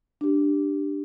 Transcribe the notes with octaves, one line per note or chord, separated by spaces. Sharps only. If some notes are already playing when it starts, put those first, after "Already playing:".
D4 G4